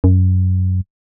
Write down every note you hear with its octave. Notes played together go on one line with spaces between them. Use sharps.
F#2